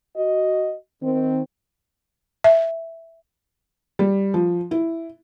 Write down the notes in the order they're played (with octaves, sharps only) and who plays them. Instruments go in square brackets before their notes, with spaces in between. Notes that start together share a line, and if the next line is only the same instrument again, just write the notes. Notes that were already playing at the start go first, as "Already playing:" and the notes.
[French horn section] F#4 D#5
D#3 C4
[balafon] E5
[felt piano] G3
F3
E4